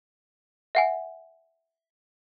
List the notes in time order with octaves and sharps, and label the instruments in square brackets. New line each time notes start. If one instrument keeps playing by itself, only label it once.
[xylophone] E5 F#5 G#5